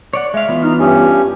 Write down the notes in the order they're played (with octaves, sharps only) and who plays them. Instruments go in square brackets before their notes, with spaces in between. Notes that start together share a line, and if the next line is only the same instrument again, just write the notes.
[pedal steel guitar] C#5 D5 F#5
[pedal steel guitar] G#3 F5 [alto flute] E5
[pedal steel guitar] E3 B3 F4
[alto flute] D#4 [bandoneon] F6
[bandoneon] G2 C#4 [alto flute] G4